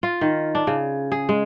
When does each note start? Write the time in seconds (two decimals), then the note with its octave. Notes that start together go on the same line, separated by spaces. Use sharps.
0.03 F4
0.21 D#3
0.55 D4
0.67 C#3
1.12 G#4
1.29 G#3